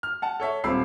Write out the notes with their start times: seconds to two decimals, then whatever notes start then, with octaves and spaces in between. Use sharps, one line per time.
0.03 F6
0.22 F#5 A5
0.40 A4 C#5 E5
0.64 D#1 C4 B5 E6 C7